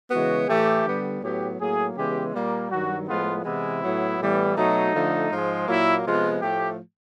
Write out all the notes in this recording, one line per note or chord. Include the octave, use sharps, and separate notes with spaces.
C#3 E3 G#3 B3 F#4
A2 E3 A3 G4
D3 G3 B3
A2 F#3 B3 G4
A2 F#3 A#3 G#4
C#3 E3 G#3 B3 G4
A#2 G3 A#3
G2 D#3 F#3 F#4
A2 F3 G#3 B3 F4
C3 E3 G#3 B3 E4
A2 F#3 B3
A2 E3 G3 B3
B2 F#3 A3 D#4
D3 F3 A3
G#2 F3 G#3
A#2 F#3 A#3 E4
C3 F3 G#3 B3 F4
A2 F3 A3 G4